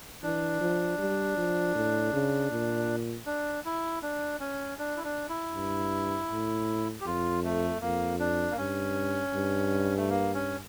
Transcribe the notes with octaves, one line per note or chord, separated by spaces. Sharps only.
E3 D4
F3
G3
F3
A2
C#3
A#2
D4
E4
D4
C#4
D4
E4
D4
E4
G2
A2
G4
F2 F4
A3
F2 A#3
D4
A#3
G2 C#4
G2
A3
A#3
C#4